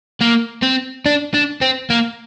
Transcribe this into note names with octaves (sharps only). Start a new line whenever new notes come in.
A#3
C4
D4
D4
C4
A#3